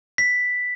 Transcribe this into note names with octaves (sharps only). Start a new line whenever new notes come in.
B6